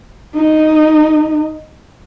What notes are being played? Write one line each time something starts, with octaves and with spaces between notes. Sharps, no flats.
D#4